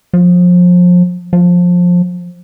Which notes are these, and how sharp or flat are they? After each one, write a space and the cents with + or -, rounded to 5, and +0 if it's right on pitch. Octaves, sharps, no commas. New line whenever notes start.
F3 +30
F3 +20